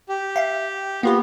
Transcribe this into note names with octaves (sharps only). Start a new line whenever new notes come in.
G4
E5 F5
A#3 B3 F4 G4